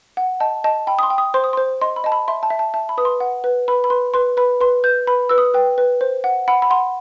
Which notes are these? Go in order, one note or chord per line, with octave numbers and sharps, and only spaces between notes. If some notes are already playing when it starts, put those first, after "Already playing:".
F#5
D#5 A5
D#5 A5
G5 B5
D#6
C6
G5
D#6
C5 C6
D#6
C5 C6
D#5 C6
B5
D#5 A5
B5
E5 C6
A5
E5
A5
E5 A5
B5
B4 D#6
C6
F#5
B4
B4 B5
B5
B4 C6
B4 C6
B4 B5
B4 C6
B4 G6
B4 B5
B4 E6
D#6
B4 G5
B4
C5
F#5
F#5 B5
B5
F#5 C6